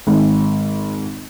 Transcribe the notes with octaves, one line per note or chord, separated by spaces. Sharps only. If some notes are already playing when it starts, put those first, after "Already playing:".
G#1